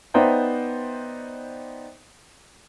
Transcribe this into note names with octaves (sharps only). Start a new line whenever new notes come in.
B3 D#4 C5 D5 E5 G5